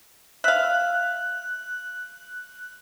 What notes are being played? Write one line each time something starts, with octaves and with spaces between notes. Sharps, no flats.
E5 F5 F#6